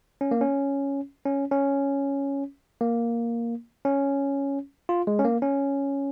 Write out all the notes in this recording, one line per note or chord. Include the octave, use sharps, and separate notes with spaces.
C#4
A#3
C#4
C#4
C#4
A#3
C#4
F4
G#3
C#4
A#3
C#4